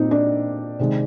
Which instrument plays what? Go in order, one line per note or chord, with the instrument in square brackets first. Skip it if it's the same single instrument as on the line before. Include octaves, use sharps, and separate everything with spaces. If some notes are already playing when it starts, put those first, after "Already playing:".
Already playing: [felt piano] A#2 A#3 C4 D#4
D4
C3 D#3 G#3